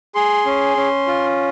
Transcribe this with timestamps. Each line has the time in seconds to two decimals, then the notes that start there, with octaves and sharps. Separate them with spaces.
0.15 G#4 C6
0.46 C#4
0.77 C#4
1.07 F4